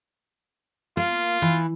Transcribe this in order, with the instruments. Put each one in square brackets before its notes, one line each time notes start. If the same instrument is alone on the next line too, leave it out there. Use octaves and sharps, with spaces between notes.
[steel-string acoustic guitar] A#3 [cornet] F4
[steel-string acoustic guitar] E3